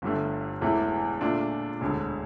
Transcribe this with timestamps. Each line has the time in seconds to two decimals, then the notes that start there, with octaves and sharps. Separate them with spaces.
0.02 G1 G2 D3 A3
0.61 E1 E2 E3 A3
1.21 A#2 A3 D4 F4
1.81 E1 D2 D3